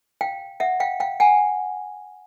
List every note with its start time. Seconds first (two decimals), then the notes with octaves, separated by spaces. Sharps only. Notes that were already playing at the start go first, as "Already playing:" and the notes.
0.21 F5 G5
0.60 E5 F#5
0.80 F5 G5
1.00 F5 G5
1.20 F#5 G#5